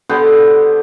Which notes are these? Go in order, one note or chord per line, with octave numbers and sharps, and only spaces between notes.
D3 B3 G4 C5